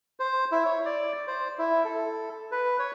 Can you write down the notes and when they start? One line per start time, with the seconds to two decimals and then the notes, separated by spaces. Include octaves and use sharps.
0.20 C5
0.52 E4
0.66 C#5
0.85 D5
1.27 C5
1.59 E4
1.85 A4
2.52 B4
2.79 C#5